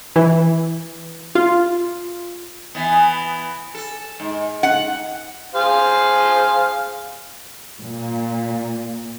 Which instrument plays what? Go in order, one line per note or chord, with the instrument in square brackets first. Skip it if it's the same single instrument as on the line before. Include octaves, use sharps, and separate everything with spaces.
[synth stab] E3
F4
[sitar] E3 B3
A4
G#2
[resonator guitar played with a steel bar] F#5
[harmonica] G#4 C5 F5
[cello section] A#2